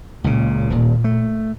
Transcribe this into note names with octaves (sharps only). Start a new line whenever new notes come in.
C#2 A#2 C#3
D#1 D#2
A3